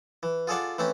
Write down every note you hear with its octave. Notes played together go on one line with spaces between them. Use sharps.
E3
F4 G#4 A4 D5 F#5
E3 A3 C4 C#4